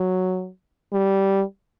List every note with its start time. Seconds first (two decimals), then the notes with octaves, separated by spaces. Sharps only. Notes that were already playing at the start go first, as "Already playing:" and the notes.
Already playing: F#3
0.93 G3